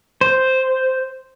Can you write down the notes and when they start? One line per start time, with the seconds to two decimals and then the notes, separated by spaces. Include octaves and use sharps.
0.21 C5